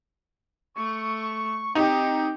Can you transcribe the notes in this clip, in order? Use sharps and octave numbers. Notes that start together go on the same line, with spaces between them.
A3 C#6
C4 D#4 G4